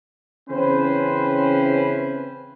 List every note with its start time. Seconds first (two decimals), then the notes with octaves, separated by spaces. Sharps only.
0.50 C#3 E3 C4 C#4 B4 C5